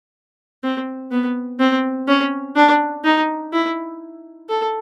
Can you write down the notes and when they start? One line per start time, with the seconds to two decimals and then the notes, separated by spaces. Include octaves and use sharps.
0.63 C4
1.11 B3
1.60 C4
2.08 C#4
2.56 D4
3.04 D#4
3.53 E4
4.49 A4